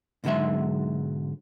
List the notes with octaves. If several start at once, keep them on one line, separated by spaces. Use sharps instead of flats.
B1 G#2 D3 F#3 G#3 E5